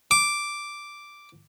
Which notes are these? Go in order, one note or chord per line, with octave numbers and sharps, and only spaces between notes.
D6